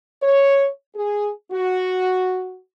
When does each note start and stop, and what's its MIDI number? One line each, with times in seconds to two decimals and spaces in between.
0.21 0.67 73
0.95 1.31 68
1.52 2.61 66